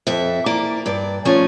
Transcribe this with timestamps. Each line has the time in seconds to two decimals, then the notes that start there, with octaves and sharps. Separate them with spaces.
0.07 F2 E5
0.46 E3 A#3 D5
0.86 G2 D5
1.25 F3 A3 C#4